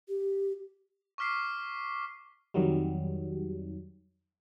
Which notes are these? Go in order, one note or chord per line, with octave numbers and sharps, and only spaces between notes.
G4
C#6 D6 F6 B6 C7
F2 D#3 F#3 G3